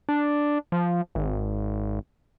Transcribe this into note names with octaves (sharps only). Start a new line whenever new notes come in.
D4
F3
G#1